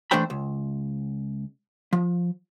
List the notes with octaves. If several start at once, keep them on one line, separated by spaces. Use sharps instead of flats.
E3 A3 D4 C5 G5 B5
C#2
F3